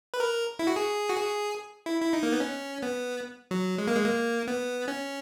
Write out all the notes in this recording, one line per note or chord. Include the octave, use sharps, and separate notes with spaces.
B4
A#4
E4
F#4
G#4
F#4
G#4
E4
E4
D#4
A#3
B3
C#4
B3
F#3
G#3
A#3
G#3
A#3
B3
C#4